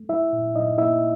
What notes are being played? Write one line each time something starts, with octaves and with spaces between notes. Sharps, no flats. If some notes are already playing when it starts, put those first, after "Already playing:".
Already playing: A3
G3 E4 E5
A#2
A#2 D#4 D#5
A#3 E4 E5